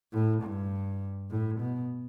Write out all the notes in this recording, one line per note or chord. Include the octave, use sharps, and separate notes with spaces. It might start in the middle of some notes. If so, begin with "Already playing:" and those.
A2
G2
A2
B2